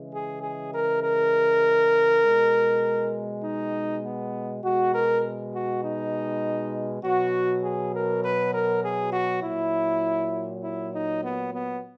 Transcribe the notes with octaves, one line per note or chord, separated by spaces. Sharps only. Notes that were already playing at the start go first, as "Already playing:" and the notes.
Already playing: C#3 E3 G#3
G#4
G#4
A#4
A#4
B2 G#3
D#4
B3
B2 G#3 F#4
A#4
F#4
D#4
B2 F#3 F#4
G#4
A#4
B4
A#4
G#4
F#4
A#2 F#3 E4
E4
D#4
B3
B3